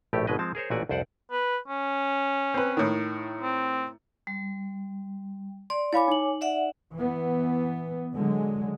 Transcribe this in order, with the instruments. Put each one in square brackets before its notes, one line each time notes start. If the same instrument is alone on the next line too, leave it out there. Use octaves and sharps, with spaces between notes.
[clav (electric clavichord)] A#1 A2 A3 G4
G#1 B2 G#3 B4 D#5
F3 G#3 C4 A5
G#4 A#4 C5 C#5
A1 A#2 A3 F#4 D5 G#5
C2 F2 C5 D5 F#5
[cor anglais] B4
C#4
[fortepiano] C4 B4
A2 D#3
[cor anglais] C4
[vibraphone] G3
[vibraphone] D5 [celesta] C6
[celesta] E4 F5 B5 [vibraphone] C#5 G#5 D6
[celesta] D#4 F#7
[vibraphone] D5 E5 F#5
[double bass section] E3 B3
D3 F#3 G#3